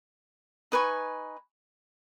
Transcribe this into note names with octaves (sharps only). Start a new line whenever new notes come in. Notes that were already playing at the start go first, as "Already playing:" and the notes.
D#4 B4 G#5 C#6